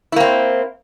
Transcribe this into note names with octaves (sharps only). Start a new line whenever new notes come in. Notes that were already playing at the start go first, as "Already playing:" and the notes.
A#3 C4 E4